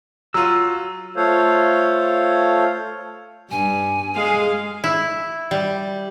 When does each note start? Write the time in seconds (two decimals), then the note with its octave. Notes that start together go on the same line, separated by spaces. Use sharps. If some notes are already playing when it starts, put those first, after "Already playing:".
0.34 F#3 F4 E6
1.16 A3 F4 A4 C5 C#5 F5
3.51 G2 G#5
4.16 G#3 G#4 F5
4.84 E4
5.51 G3